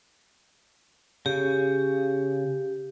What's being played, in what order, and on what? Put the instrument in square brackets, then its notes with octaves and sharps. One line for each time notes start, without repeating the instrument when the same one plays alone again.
[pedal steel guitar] C#3 [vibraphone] G4